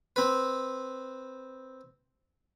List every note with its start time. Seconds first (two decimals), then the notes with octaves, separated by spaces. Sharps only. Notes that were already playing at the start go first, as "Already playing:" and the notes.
0.16 C4 B4